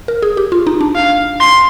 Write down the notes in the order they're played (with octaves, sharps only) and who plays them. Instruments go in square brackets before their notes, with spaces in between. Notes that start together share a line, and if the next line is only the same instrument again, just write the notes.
[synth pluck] A#4
G#4
G4
F4
D#4
D4
[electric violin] F5
C6